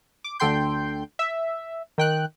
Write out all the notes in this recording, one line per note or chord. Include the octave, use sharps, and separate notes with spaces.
D6
D2 D3 A4 G5 C6 G6
E5
D#3 G5 F#6